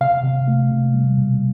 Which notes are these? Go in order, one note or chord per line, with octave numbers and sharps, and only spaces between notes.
C3 F5
C3
A3
C3
G3
B2